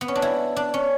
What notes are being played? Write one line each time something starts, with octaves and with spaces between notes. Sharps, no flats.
B3
C#4
D4
E4
D4
C#4